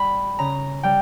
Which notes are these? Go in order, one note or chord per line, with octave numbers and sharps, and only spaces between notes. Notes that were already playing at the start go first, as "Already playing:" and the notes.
Already playing: G3 B5
C#3 A#5
G3 G5